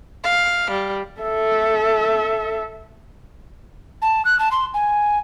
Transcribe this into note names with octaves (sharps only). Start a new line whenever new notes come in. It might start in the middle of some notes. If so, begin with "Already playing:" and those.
F5
G3
A4 E5
A5
F#6
A5
C6
G#5